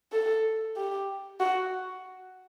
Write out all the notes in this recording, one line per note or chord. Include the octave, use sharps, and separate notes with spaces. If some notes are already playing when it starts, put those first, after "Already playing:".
A4
G4
F#4